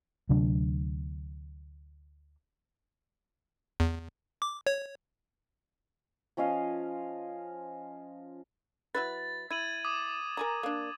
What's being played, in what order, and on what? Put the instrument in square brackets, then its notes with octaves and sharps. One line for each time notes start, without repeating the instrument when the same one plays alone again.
[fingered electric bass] D2 C3 F#3 D4
[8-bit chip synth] E2
D6
C#5
[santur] F3 C#4 D#5 F5
[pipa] F#3 E4 B4 [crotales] A6
[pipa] E4 [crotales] G#6 D#7 F#7
[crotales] D6 D#6
[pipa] A#4 G#5 A#5
A#3 D4